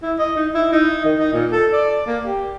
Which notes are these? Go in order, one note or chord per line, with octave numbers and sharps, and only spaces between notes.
E4
D#5
D#4
E4
D#4
D#3
D#4
A#2
A4
D5
A#3
G4